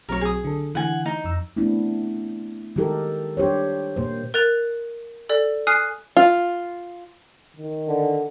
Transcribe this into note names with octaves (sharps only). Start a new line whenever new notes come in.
B1 F#3 C4 A#4 C#5
G#4 D#6
D3 A4
D3 E3 F#5 G#5
D#4
F2 E6
A3 B3 C4 D4 E4
D#3 G#3 D#4 G4 A4 A#4
D4 G4 C5 C#5
A#2 A#3 C5
A#4 F#6 A6 F7
A4 D5
G#5 D#6 F6 F#6 C7 D#7
F4
D#3
D3